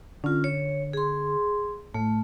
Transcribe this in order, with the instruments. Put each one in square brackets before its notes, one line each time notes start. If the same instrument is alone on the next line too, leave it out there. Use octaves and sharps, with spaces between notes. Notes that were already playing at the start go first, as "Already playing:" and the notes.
[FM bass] D3 [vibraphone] C#4 F4
[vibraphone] C#5
G#4 C6
[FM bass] A2 [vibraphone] A3